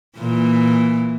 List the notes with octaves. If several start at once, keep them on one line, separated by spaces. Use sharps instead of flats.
A#2 E3